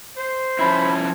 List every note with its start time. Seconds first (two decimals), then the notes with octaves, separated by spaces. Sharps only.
0.17 C5
0.59 F3 C#4 E4 B5